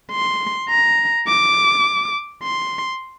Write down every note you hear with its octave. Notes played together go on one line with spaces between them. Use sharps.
C6
A#5
D6
C6